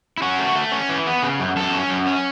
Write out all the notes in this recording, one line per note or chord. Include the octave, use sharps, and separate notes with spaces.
E4
C#4 F#4
A3
A3
C#4
E3
B3
C#3
F#2
F#2 A4
C#4
F#2
C#4